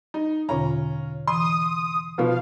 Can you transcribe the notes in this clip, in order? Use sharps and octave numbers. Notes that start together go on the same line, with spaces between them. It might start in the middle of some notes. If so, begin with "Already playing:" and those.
D#4
E2 B2 D3 C#4 F4 A#5
E3 C6 D#6
B2 F3 B3 F5